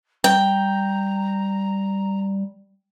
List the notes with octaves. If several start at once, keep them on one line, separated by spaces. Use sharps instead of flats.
G3 G5 A#5